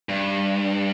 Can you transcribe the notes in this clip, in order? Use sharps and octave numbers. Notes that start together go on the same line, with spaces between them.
G2